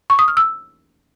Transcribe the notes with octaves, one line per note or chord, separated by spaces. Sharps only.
C#6
D#6
F6
E6